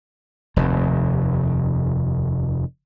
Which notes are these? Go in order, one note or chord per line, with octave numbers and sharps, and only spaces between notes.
F1 D#2